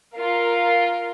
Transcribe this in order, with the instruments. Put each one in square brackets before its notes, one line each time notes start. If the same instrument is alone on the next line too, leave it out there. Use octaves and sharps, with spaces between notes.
[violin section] F4 A#4 F5